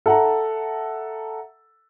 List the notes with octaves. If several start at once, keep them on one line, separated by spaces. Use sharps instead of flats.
A4 E5 F#5 A5 A#5